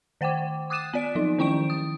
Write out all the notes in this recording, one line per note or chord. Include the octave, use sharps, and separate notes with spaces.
D#3 C5 F#5 G5 D6
D6 D#6 F#6 A6 D#7 E7
B3 D5 D7
F3 F#3 D#4
D#3 C#4 E4 G5 C#6 D7
D#6